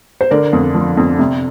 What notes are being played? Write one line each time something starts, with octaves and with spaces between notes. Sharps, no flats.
C5
D3 A#4 D5
F2
F3
F2
C3